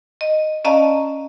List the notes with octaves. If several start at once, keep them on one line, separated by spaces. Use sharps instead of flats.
D#5
C#4 D5 D#5 F5 A5 A#5